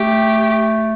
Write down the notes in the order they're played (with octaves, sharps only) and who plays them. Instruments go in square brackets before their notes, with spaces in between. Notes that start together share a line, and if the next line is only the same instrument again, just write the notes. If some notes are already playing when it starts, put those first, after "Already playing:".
Already playing: [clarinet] A3 [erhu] G4